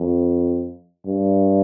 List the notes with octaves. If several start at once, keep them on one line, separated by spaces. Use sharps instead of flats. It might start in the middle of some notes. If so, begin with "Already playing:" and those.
Already playing: F2
G2